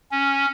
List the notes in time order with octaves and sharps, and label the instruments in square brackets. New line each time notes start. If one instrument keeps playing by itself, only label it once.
[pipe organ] C#4